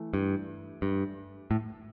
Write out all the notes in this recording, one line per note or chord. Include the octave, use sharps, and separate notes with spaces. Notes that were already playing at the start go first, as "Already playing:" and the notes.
Already playing: E3 A3 E4 A4
G2
G2
A2